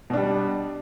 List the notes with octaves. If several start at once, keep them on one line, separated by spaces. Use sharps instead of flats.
B2 G3 D4